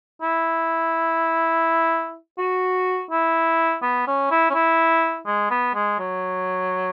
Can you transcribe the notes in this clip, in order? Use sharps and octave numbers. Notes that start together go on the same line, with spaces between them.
E4
F#4
E4
B3
C#4
E4
C#4
E4
G#3
B3
G#3
F#3